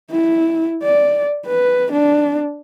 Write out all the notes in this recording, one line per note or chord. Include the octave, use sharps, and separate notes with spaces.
E4
D5
B4
D4